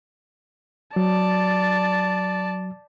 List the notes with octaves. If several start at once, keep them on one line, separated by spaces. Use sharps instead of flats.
F#3 D5 A5